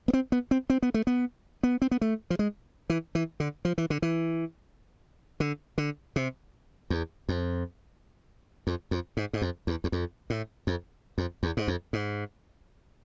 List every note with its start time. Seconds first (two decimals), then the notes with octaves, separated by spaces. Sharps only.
0.08 B3
0.13 C4
0.32 B3
0.51 C4
0.70 C4
0.83 B3
0.94 A3
1.07 B3
1.63 B3
1.82 C4
1.91 B3
2.01 A3
2.30 F3
2.39 G#3
2.90 E3
3.15 E3
3.40 D3
3.65 F3
3.78 E3
3.90 D3
4.02 E3
5.40 D3
5.78 D3
6.16 C3
6.90 E2
7.29 F2
8.67 F2
8.91 F2
9.17 G#2
9.33 G#2
9.42 F2
9.67 E2
9.84 E2
9.92 F2
10.30 A2
10.67 F2
11.18 F2
11.43 E2
11.57 G#2
11.68 F2
11.93 G#2